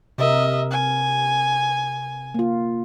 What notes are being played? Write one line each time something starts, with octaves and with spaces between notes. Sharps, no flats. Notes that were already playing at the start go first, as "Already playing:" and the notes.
C3 A#4 D#5 E5
G#5
A#3 F4